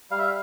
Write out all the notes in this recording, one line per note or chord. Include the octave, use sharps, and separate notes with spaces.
G3 F5
E5
F5